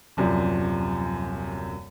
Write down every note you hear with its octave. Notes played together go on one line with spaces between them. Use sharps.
D#1 F#2 C3 F3 D5